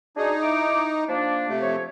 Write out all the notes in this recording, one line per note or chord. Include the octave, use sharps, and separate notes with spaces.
D4 D#4 F#4 G#4
E4 D6
F3 A#3 D4
C3 A3
F3 C#5